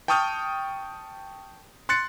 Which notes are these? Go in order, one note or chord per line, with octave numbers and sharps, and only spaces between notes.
G5 A5 C#6 D#6 F6 G6
C6 F#6 A6 C#7